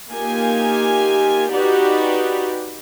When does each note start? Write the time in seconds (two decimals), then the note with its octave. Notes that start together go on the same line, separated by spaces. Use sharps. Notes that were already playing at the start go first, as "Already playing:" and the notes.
0.10 A#3 D#4 F4 G4 G#5
1.52 D#4 F#4 G4 B4 D5